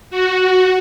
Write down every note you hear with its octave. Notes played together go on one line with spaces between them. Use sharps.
F#4